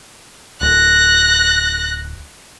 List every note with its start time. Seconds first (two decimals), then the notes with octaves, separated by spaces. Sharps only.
0.61 D1 D2 F#6 A#6